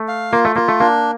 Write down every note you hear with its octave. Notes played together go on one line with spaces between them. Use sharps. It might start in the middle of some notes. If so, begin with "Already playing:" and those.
Already playing: A3
F5
A#3 F4
A3
A#3 F4
A3
A#3 D4